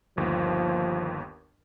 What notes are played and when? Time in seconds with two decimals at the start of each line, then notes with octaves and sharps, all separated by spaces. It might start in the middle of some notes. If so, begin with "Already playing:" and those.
0.17 G1 D#2 F3